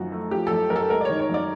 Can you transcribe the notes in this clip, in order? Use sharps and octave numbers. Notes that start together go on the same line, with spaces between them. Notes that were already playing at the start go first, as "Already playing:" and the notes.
Already playing: F#2 D#3 F3 F#4
A3
F3 G4
F#2 A4
F#2 A#4
A4
G#3 A#4
D5
D#3 C#5
C#5
F#2 D5